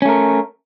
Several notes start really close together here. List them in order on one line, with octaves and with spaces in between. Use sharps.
C#4 A3 A#4